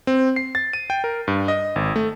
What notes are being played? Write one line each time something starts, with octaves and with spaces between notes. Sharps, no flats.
C4
C7
A6
D#7
G5
A#4
G2
D#5
G#1
A3